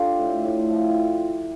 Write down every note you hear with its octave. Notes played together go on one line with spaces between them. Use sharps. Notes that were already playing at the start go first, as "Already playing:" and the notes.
Already playing: D4 F4 G4 A4
A2
A2
F3